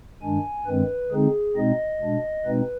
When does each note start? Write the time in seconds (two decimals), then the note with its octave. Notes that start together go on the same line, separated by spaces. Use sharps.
0.22 G2 D#3 G#3 D4 G#5
0.66 G2 D#3 G#3 C4 B4
1.12 D3 G#3 C4 D#4 G#4
1.56 B2 G#3 C4 D#4 D#5
2.02 B2 G#3 D4
2.46 B2 G#3 C4 D#4 B4